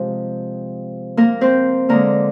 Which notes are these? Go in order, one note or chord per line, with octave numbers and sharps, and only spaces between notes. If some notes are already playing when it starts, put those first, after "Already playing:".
Already playing: C3 F3 G#3
A#3 A#4
C4 C5
D3 G#3 A#3 A#4